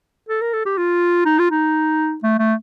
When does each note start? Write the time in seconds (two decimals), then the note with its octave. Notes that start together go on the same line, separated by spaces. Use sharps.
0.29 A4
0.41 A#4
0.53 A4
0.66 G4
0.78 F4
1.25 D#4
1.39 F4
1.51 D#4
2.23 A3
2.39 A3